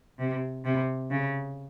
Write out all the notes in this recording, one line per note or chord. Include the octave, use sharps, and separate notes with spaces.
C3
C3
C#3